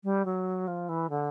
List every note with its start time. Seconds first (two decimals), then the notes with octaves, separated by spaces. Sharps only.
0.04 G3
0.25 F#3
0.67 F3
0.89 E3
1.10 D3